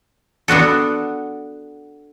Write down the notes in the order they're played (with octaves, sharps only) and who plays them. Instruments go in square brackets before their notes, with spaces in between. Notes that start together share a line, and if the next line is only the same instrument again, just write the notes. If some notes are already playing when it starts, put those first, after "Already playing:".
[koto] B3 D4 F#4 A4